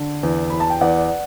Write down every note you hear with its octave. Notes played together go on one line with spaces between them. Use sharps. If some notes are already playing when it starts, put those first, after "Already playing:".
Already playing: D3
E2
E2 B5
A5
G5
E2 D5 F#5